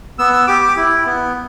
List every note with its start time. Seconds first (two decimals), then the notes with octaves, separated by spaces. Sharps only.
0.19 B3 E6
0.33 E6
0.47 G4 D6
0.63 D6
0.77 E4
1.06 B3